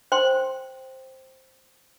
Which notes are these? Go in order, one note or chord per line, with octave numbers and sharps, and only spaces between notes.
C5 G5 C6